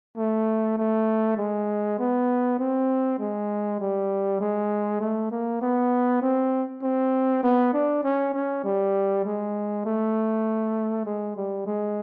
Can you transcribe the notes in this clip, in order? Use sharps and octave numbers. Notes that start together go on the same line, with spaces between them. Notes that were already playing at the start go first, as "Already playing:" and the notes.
A3
A3
G#3
B3
C4
G#3
G3
G#3
A3
A#3
B3
C4
C4
B3
D4
C#4
C#4
G3
G#3
A3
G#3
G3
G#3